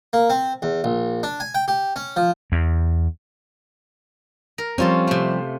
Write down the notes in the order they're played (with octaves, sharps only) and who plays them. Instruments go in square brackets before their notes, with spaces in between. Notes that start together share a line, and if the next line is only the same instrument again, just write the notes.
[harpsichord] A#3
C4
E2
A#1
D4
G#5
G5
G4
C#4
F3
[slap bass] E2
[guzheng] A#4
[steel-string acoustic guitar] F3 G3 C4 [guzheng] C#4 F4 A4
[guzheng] C3 A3